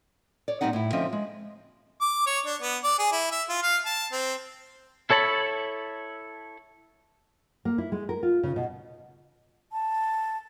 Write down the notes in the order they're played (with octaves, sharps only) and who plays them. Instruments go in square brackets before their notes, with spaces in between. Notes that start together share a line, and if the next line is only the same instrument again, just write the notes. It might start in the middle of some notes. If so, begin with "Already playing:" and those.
[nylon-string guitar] C#5 D5
A#2 G3 B3 C4 D#4 F#5
A2 E4
D3 F3 C4 C#4 D#5 E5
G#3
[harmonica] D6
C#5
D4
B3
D5
G#4
E4
E5
F4
F5
A5
C4
[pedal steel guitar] E4 A4 C#5 A5 B5
[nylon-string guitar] A#3
E4
G#3
A#4
F4
C#3
B2
[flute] A5